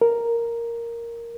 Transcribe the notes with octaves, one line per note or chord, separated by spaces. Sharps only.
A#4